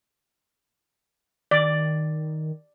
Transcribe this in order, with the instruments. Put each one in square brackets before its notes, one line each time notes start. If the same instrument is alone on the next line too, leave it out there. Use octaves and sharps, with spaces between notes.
[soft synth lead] D#3 [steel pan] D5